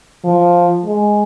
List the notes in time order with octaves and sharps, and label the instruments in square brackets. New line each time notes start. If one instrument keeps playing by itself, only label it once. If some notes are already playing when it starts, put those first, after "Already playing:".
[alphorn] F3
G#3